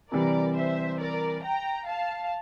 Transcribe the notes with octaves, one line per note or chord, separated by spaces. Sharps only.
C3 E3 G3 A#4 D5
C5 E5
A#4 D5
G5 A#5
F5 A5